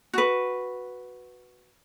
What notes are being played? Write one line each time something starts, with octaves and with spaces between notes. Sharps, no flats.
F#4 B4